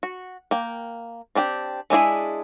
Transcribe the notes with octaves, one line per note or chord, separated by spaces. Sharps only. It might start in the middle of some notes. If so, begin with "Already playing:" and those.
F#4
A#3 G5
C4 D4 G4 G5
G#3 D4 E4 G#4